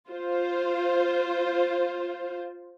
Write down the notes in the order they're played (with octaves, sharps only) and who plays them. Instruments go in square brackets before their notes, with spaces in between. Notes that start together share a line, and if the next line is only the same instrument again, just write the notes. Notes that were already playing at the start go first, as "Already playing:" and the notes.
[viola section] F4 C5